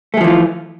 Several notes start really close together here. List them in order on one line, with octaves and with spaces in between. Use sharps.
A3 G#3 F3 E3 F4